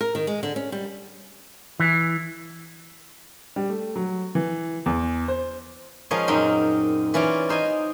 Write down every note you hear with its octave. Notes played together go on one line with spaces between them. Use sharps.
A#4
D#3
G#3
D3
C#4
G3
E3
G3
A3
F#3
E3
E2
C5
F3 G#3 C#4 A#4 C#5 D#5
F#2 A#2 C4 D#4 G5
E3 C#4 F4 D5
D#4 C5 D#5 G#5